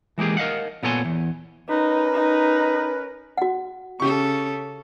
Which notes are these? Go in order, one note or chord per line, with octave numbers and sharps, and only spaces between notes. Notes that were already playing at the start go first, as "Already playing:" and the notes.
E3 G#3 A#3 G4 G#4
A#4 D#5 F5 F#5
A#2 B3 A4 C#5 G#5 C6
E2
C#4 D#4 A#4 B4
D#4
F#4 F#5
C#3 C#4 G4 A4 C#6